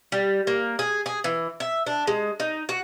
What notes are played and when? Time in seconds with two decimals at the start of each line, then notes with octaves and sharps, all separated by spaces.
0.12 G3
0.47 A#3
0.79 G#4
1.06 G#4
1.24 E3
1.60 E5
1.87 D4
2.07 G#3
2.40 D#4
2.69 F#4